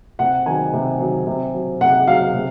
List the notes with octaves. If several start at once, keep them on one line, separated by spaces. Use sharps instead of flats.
C3 F#5
D#3 F#3 G#5
C3
D#3 F#3
C3
F#3
C3 F#5
F#3 F5
C3